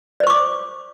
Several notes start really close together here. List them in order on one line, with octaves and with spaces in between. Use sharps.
D5 C5 C#6 D6